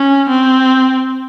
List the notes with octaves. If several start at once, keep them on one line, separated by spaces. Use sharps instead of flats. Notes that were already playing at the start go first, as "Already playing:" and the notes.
Already playing: C#4
C4